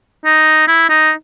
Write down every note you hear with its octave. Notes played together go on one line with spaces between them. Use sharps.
D#4
E4
D#4